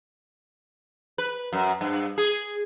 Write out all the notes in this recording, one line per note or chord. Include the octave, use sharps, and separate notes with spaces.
B4
F#2
G2
G#4